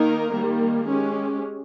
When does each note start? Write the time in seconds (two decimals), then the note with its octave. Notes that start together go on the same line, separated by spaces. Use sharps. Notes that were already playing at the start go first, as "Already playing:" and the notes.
Already playing: D#3 A#3 D#4 A#4
0.34 D#3 G3 A#3
0.87 G#3 C#4 G4